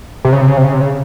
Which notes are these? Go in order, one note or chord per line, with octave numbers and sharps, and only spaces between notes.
C3
C#3
C3
C#3
C3
C#3
C3
C#3